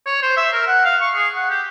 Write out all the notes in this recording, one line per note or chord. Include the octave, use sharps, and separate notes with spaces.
C#5
C5
E5
A#4
F#5
F5
C#6
G#4
F#5
G4